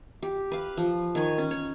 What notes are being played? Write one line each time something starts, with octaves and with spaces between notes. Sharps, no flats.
G4
B4 F5
F3
D#3 C#5 G#5
C#4
C#5